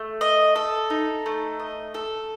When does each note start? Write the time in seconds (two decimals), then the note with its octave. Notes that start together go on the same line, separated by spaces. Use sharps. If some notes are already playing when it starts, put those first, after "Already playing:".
Already playing: A3
0.21 D#5
0.56 A4
0.90 D#4
1.26 A3
1.59 D#5
1.94 A4